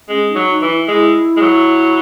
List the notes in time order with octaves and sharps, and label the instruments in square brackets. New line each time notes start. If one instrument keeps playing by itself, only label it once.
[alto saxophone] G#3 [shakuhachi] C#4
[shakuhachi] D#4
[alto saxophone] F#3
[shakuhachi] D#4
[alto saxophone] E3
[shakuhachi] E4
[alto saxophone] G#3 [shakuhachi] E4
[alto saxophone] G#3
F#3